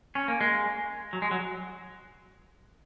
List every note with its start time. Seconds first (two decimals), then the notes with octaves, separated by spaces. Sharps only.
0.15 C#4
0.28 A#3
0.41 G#3
1.13 F#3
1.22 G#3
1.31 F#3